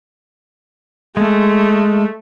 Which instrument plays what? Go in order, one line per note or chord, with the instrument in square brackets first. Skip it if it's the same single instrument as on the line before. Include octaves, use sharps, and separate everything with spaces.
[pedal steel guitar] G#3 [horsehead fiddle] A3